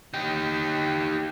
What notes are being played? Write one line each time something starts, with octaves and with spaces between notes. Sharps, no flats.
D#4 G4